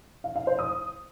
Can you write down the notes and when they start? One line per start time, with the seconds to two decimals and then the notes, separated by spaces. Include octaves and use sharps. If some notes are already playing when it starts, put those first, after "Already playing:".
0.24 F5
0.36 F5
0.47 C5
0.59 D#6